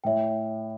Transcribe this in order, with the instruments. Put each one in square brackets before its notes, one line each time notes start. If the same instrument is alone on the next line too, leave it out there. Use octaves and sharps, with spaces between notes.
[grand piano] A2 [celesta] C#5 E5 G5